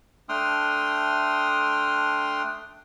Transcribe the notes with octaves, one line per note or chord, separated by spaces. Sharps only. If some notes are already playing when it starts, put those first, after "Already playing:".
A3 D4 G5 C6 D#6 F6